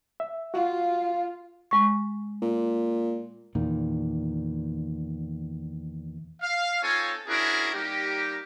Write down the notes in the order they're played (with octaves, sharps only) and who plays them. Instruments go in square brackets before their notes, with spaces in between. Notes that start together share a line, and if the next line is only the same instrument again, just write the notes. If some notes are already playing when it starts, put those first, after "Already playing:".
[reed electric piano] E5
[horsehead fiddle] F4 [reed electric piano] F#4 [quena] F5
[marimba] G#3 C#6
[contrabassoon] A#2
[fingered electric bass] E2 A#2 D#3
[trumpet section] F5
C4 D#4 F4 A4 C#5 G#5
C#4 D4 E4 F#4 G#4 A#4
G3 A#3 D#4 G4